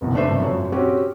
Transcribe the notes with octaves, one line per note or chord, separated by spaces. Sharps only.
F#1 B1 E2
A3 D4 B4 C5 E5
G#1 G2
F#2 A#2 C#5
C4 C#4 F#4 G4